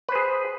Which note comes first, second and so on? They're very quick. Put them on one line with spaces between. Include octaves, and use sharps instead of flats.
B4 C5 G#4